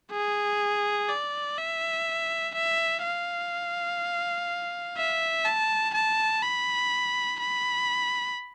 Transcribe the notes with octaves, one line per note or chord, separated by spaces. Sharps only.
G#4
D5
E5
E5
F5
E5
A5
A5
B5
B5